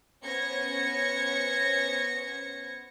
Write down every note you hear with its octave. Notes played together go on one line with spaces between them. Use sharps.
B3 C#4 C5 G#6 A#6 C#7